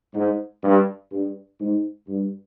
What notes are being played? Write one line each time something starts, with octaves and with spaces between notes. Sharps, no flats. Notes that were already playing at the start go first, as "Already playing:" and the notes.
G#2
G2
G2
G#2
G2